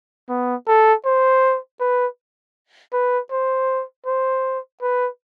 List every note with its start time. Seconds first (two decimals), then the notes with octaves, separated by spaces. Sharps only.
0.29 B3
0.67 A4
1.05 C5
1.80 B4
2.93 B4
3.31 C5
4.06 C5
4.82 B4